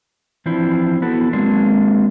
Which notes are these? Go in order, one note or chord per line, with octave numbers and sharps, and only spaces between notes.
E3 F3 C4 D4 E4
B3 E4 F#4 A4 B4
F#3 G#3 A#3 C4 D4